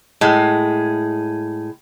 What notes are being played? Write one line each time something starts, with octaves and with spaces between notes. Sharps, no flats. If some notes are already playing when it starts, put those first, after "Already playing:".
A2 G#3